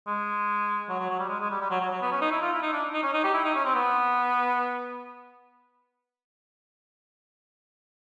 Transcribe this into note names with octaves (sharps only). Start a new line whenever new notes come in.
G#3
F#3
F#3
F#3
G3
G#3
G#3
G3
G3
F#3
F#3
F#3
B3
C#4
D#4
E4
F4
E4
D#4
D4
D#4
C#4
D#4
G4
E4
D#4
C#4
C4
B3